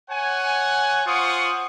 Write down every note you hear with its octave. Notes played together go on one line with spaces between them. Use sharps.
C#5 F#5 G#5
F4 C5 F#5 C#6 D#6